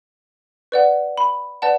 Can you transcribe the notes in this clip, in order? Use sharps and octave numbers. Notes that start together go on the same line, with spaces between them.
B4 D5 F#5
B5
B4 D5 F#5 A5